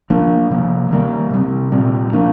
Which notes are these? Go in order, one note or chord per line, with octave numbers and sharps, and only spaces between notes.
F3 A#3 D4
C3 F3 A#3
D#3 G3 A#3
C3 G3 C4
A#2 G3 C4
F3 A#3 D4